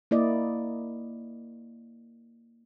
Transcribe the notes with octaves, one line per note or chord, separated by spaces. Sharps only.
A#3 E4 D5 D#5